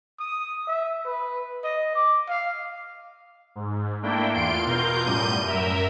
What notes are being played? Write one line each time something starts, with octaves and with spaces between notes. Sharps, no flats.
D#6
E5
B4
D#5
D6
F5
G#2
A3 A#3 D4 E4 G5
E2 F4 C6 D7
B2 F4 A#4 G6
F#2 A2 G3 G6 D#7
F#2 A#4 E5